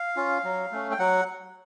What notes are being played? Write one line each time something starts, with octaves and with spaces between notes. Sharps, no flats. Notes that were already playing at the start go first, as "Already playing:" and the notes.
Already playing: F5
C#4 F4
F#3
A3 C#4
G5
F#3 F#5